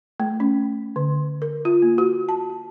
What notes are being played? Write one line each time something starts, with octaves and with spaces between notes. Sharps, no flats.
A3
C#4
D3
A#4
F4
A#3
F#4
A5
F#4